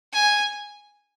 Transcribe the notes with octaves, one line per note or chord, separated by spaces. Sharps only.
G#5